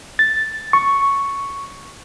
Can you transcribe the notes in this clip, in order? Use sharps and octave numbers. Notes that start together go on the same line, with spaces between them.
A6
C#6